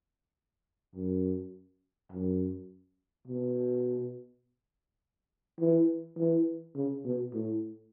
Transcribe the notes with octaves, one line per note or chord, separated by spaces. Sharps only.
F#2
F#2
B2
E3
E3
C#3
B2
A2